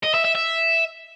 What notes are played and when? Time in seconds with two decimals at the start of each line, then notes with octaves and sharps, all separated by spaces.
0.03 D#5
0.14 E5
0.24 E5
0.35 E5